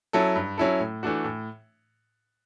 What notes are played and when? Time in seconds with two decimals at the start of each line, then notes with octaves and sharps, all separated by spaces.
0.13 F#3 C#4 E4 A4
0.36 G2
0.58 F#3 C#4 E4 A4
0.80 A2
1.03 E3 A3 D4 F#4
1.24 A2